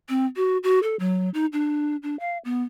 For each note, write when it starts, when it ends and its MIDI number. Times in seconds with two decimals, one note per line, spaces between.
0.09 0.26 60
0.36 0.58 66
0.63 0.79 66
0.83 0.96 69
0.99 1.30 54
1.34 1.46 63
1.53 1.96 62
2.03 2.18 62
2.20 2.38 77
2.45 2.63 59